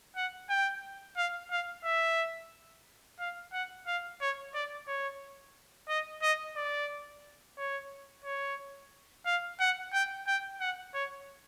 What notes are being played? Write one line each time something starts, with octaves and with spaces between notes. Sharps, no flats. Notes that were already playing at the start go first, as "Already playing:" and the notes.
F#5
G5
F5
F5
E5
F5
F#5
F5
C#5
D5
C#5
D#5
D#5
D5
C#5
C#5
F5
F#5
G5
G5
F#5
C#5